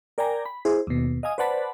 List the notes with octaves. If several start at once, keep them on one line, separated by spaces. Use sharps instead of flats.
A#4 D5 G5 G#5 A#5
B5
E4 G#4 C5
D#2 B2
D#5 F5 G#5 D#6
B4 C5 D5 F#5 A5 B5